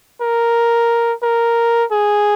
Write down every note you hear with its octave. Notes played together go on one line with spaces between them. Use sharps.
A#4
A#4
G#4